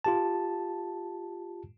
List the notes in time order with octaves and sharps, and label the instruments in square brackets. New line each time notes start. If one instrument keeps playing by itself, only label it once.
[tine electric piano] F4 G4 A5